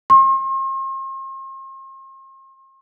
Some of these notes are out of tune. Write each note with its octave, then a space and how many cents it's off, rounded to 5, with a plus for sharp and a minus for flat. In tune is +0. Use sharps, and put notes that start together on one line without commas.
C6 +45